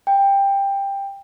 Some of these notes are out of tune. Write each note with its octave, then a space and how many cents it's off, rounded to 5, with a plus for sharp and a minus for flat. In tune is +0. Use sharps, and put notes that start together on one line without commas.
G5 +15